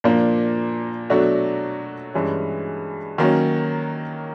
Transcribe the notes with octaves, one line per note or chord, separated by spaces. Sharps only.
A#2 F3 A#3 D4
B2 F#3 A3 D4 F#4
G2 E3 G#3 C#4
D#3 F#3 A#3 C#4